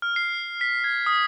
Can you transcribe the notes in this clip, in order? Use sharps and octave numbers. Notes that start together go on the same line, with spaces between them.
F6
C7
B6
G#6
D#6